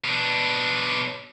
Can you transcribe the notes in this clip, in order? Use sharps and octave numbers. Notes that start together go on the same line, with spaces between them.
B2 D4